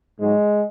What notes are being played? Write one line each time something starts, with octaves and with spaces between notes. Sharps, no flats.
G#2 F#3 G#3